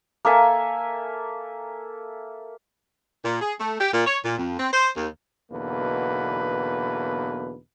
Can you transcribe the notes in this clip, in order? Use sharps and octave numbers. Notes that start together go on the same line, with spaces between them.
A#3 A4 E5 G#5
A#2
G#4
A3
G4
A#2
C#5
A#2
F2
C4
C5
D#2
B1 E2 B2 D3 A#3 B4